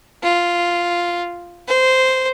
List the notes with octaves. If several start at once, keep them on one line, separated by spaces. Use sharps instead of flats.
F4
C5